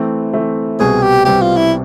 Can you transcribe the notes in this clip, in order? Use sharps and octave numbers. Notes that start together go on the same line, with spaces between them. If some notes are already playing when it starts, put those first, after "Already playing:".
Already playing: E3 A3 C4
E3 A3 C4
C2 B2 G3 C4 G#4
G4
C2 B2 G3 C4 G4
F4
E4